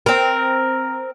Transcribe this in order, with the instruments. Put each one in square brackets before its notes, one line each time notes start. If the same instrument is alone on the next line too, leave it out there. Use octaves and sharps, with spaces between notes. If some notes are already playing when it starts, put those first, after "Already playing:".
[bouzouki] C4 A#4